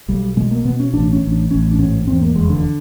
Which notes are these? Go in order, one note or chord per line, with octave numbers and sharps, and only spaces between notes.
B1 G3
B2 G#3
A#3
B2 B3
C#4
A1 D4
C#4
A1
D4
A1 C#4
D4
G#2 C#4
E2 C4
A#3
F1 G#3
D3